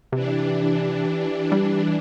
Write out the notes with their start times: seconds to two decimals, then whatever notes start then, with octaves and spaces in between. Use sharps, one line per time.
0.12 C3 E3 D4 G4
1.52 G3